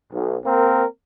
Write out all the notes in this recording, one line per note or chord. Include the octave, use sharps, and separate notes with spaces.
B1
A#3 C4 A#4